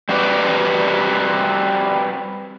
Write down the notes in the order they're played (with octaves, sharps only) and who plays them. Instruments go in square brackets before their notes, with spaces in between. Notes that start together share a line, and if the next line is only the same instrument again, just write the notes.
[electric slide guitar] G3 C4 F#4 G4 B4 D5